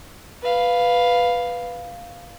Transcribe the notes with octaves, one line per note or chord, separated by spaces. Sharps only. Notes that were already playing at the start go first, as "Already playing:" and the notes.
B4 F5